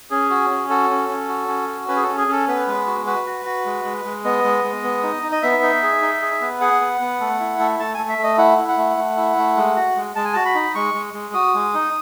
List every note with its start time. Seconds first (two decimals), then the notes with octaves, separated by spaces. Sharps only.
0.11 C#4 G#4
0.30 F#4
0.50 C#4
0.70 F#4 A4
0.90 C#4
1.09 C#4
1.29 F#4
1.48 C#4
1.68 F#4
1.88 C#4 B4
1.96 G#4
2.03 C#4 A4
2.18 G#4
2.28 C#4 A4
2.48 B3 B4
2.67 G#3
2.87 F#4
3.06 F#4 B4
3.27 F#4
3.45 F#4
3.66 G#3
3.85 G#3
4.05 G#3
4.24 B3 D#5
4.44 G#3
4.64 G#3
4.83 B3
5.03 D#4
5.23 D#4
5.32 D#5
5.42 B3 E5
5.63 D#4
5.83 G#4
6.02 D#4
6.22 G#4
6.41 B3
6.61 G#4 F#5
6.81 B3
7.01 B3
7.20 A3
7.40 E4
7.59 A3
7.79 A3 A5
7.94 A3 G#5
8.09 E5
8.18 A3
8.23 D#5
8.38 E4 F#5
8.58 E4
8.68 F#5
8.78 A3
8.97 A3
9.17 E4
9.37 A3
9.57 G#3
9.77 F#4
9.96 G#3
10.16 G#3 A5
10.25 G#5
10.33 F#4 A5
10.45 B5
10.55 D#4
10.75 G#3 C#6
10.94 G#3
11.14 G#3
11.34 F#4 D#6
11.54 G#3
11.74 D#4